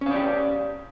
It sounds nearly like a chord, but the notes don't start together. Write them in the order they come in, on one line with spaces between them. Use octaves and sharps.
C#4 F5 D5 G4